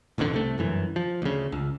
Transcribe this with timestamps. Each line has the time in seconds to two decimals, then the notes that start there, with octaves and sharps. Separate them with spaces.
0.18 E1 A1 F2 D3
0.31 C2 C3 A3
0.58 G1 F#2 E3
0.96 F3
1.22 D2 C#3
1.52 C#2